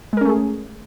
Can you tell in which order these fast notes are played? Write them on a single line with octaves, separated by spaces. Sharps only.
G#3 A#4 C#4 A3 G#4